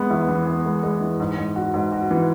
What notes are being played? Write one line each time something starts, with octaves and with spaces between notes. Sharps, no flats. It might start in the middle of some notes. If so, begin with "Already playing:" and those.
Already playing: G#3 B3
E2
E3
B3
G#3
G#3
E3
G#2
G#2
F#4
G#2
F#4
E3